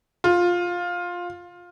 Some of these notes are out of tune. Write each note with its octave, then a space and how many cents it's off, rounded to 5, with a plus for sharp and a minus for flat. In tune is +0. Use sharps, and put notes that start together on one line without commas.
F4 +10